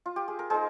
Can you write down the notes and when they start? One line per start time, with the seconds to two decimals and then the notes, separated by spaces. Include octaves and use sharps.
0.06 F4
0.16 G4
0.28 G#4
0.39 A#4
0.50 G#3 D#4 G#4 C5